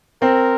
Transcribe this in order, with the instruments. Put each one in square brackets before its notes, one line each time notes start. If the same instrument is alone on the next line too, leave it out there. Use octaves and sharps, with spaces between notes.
[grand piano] C4 [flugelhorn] A#4